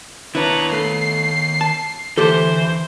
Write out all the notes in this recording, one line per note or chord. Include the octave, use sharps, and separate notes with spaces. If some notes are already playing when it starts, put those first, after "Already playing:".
D#3 D4 E4 B4 C#5 A#5
A3 C7
A5
D2 E3 G4 A4 C5